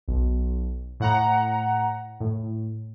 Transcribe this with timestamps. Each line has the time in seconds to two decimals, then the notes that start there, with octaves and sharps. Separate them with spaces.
0.08 B1
1.00 A2 F#5 A#5
2.20 A2